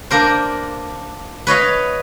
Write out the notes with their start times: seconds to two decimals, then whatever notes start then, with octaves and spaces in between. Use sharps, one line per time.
0.11 A#3 D4 A#4 C5
1.47 B4 C#5 D#5 F5